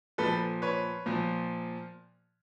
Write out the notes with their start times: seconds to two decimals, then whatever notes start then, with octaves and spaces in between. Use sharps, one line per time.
0.18 A#2 F3 A4 B4
0.62 B4 C#5
1.06 A#2 F3